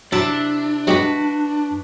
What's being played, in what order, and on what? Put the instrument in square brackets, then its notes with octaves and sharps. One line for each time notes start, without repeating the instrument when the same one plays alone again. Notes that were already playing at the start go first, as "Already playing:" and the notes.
[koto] C3 E4 A5 [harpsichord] F#3 [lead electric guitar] D4
[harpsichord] F#3 G#3 G4 [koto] F#4 B4